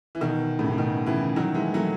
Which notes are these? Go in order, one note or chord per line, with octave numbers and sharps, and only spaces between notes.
E3
B2 D#3
A2 C#3
C#3
B2 D#3
C#3 E3
D#3 F#3
E3 G#3
F#3 A3